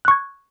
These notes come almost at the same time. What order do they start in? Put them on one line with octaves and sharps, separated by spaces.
F#6 C#6 G#6